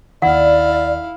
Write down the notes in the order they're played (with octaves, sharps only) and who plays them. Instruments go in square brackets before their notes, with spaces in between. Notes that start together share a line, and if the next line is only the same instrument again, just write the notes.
[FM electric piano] D#2 D#3 [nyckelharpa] E4 F5 [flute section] D5 [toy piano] F#5